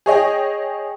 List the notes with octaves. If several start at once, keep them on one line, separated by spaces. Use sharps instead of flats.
G#4 C#5 D#5 G5